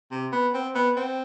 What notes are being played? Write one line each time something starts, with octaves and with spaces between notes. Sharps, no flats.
C3
B3
C4
B3
C4